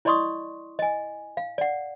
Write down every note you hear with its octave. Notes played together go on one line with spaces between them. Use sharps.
E4 D5 D#5 C6 C#6 D#6
D#5 G#5
F5
D5 F#5